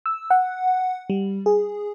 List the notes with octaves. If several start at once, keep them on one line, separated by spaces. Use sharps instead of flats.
E6
F#5
G3
G#4